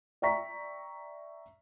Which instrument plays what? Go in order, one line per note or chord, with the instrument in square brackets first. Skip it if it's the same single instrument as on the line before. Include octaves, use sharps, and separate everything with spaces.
[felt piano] D5 E5 G5 A#5 C#6 B6